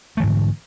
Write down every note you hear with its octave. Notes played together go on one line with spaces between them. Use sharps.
G#2 D3 E3 A3